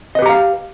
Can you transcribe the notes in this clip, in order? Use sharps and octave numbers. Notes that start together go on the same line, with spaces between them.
G4 B4 D#5 F5 A#5